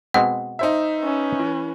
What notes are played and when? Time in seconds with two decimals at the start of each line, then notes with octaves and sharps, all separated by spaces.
0.14 B2 G#3 C4 F#5
0.59 D#4 C5 E5
0.99 C#4 B4
1.39 E3